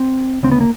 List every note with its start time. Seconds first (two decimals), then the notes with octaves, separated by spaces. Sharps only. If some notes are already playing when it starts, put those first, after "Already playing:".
Already playing: C4
0.43 D2 C#3 C4
0.52 B3
0.61 A#3